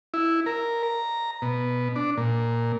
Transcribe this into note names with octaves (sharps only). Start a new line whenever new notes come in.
E4
A#4
A#5
B2
D4
A#2